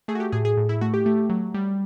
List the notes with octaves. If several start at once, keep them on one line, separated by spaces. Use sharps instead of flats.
A3 G#4
F#4
G4
A2 G#4
G#4
A2
E4
A3 F#4
G4
A3
F#3
G3